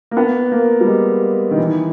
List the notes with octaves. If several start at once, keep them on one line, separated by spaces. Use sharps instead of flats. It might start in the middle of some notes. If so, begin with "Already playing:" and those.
A#3
B3
A#3
G3
G#3
D#3
E3